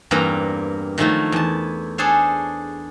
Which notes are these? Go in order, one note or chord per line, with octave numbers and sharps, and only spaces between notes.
E2 G2 A#3 C4 A#5
D#3 F3 F#3 A3 E4
E2 A5
D4 G#4 A4 C5 C#5